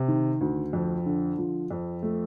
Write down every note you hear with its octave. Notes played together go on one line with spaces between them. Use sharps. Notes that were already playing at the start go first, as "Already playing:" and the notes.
Already playing: C3
D#3
D2
F2
D3
F3
F2
A3